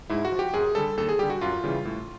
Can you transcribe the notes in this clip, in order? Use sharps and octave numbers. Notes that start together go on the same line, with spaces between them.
G#2 E4
F#4
F3
G4
F#2 G#4
D3 G3 A4
D#2 A4
G#4
D3 G3 G4
F#4
F#2 F4
C#3 E3 G3
A2